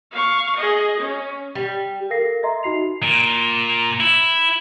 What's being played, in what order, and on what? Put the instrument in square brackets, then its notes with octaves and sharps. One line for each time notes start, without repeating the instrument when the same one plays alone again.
[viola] F5 C#6
G#4 D#5
C#4
[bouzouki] G3
[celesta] A4 A#4 F5 A#6 C7
D#5 E5 A#5 C6
D#4 F#4 C7 F7
[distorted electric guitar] A#2
E4